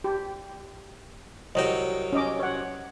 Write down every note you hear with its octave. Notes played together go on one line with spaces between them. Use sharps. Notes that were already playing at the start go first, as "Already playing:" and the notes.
G4
C2 F#3 D#5 G5
C#4 D#5 D6
C#5 F#5